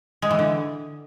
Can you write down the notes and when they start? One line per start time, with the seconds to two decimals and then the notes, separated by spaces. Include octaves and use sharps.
0.22 G#3
0.31 E3
0.39 D3